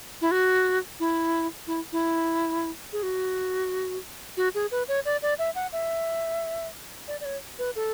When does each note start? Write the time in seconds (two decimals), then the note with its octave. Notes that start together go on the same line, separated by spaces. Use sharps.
0.21 E4
0.31 F#4
1.00 E4
1.67 E4
1.92 E4
2.93 G#4
3.03 F#4
4.37 F#4
4.55 G#4
4.71 B4
4.88 C#5
5.05 D5
5.22 D5
5.39 E5
5.55 F#5
5.73 E5
7.08 D5
7.21 D5
7.25 C#5
7.59 B4
7.75 A4